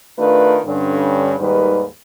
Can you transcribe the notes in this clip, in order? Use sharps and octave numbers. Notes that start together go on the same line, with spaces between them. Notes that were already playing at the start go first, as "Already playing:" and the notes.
D#3 A3 D4 F4 B4
G2 D3 C#4
D#2 G#2 D#3 G3 B4